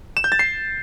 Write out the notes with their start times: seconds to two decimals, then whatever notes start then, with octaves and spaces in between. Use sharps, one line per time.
0.17 E7
0.24 G6
0.32 A6
0.39 C7